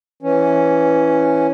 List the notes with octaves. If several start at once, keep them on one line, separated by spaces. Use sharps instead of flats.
E3 C#4